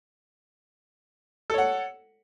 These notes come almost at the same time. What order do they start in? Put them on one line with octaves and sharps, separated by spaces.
A4 C#5 F#5